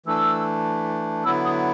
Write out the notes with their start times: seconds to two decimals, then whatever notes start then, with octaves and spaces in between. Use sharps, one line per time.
0.06 E3 A3 D4 E6
1.24 D3 F#3 B3 E4 E6
1.45 D#6